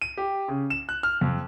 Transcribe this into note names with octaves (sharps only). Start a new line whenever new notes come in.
D#7
G4
C#3
E7
F#6
F6
F2